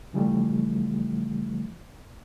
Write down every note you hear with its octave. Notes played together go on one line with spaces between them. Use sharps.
C#3 E3 F3 G3 A3